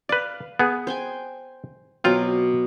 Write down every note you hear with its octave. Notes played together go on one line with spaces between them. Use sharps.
B4 D5 F5
B3 G#4
C5 G5 G#5
B2 F#3 C4 F4 D6